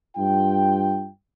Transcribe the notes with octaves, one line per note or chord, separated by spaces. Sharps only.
G2 F4 G5